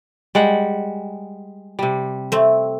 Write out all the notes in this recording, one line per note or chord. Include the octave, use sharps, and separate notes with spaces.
G3 G#3 F#5
C3 G3
A3 C4